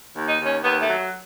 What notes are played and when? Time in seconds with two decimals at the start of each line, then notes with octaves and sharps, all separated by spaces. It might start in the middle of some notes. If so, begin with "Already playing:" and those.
0.15 D#2
0.27 D#4
0.39 D#2
0.45 C#4
0.63 D#2 B3
0.81 A3
0.87 F#3